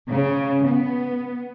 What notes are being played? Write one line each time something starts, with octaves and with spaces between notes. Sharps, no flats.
C#3
B3